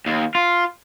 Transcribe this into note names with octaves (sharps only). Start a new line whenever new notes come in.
D#2
F4